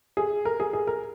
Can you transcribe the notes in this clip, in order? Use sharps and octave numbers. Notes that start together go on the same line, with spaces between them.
G#4
A#4
G#4
G#4
A#4